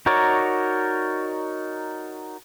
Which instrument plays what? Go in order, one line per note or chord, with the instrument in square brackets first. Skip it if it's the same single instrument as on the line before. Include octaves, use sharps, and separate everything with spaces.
[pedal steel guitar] D#4 F#4 A#4 C#5 D5